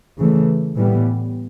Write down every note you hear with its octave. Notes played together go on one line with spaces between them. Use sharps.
C#3 E3 A3
A2 E3 G3 B3